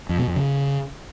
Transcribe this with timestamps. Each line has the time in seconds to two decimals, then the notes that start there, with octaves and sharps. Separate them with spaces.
0.09 F2
0.18 B2
0.27 F2
0.36 C#3